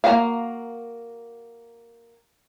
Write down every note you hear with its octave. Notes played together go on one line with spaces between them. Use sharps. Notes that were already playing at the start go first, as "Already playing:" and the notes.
A#3 C4 F#4 A#4 F5